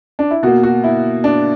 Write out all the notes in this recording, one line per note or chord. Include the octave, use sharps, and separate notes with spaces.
D4
E4
B2 A#3 F#4
F#4
E4
D4